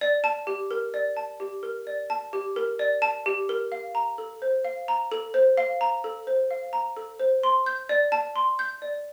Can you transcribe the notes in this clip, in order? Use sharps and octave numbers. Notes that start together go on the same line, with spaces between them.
D5
A5
G4
A#4
D5
A5
G4
A#4
D5
A5
G4
A#4
D5
A5
G4
A#4
F5
A#5
A4
C5
F5
A#5
A4
C5
F5
A#5
A4
C5
F5
A#5
A4
C5
C6
G6
D5
A5
C6
G6
D5